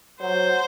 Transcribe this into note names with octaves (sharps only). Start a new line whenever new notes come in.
F#3 C5